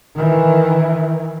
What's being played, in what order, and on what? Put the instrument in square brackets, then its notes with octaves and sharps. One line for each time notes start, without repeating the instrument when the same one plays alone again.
[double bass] D#3 E3